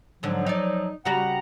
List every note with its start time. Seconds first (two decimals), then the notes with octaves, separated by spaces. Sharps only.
0.23 G#2 D3 F3 F#3
0.46 D#4 D5
1.05 C#3 G3 F#4 F#5 A#5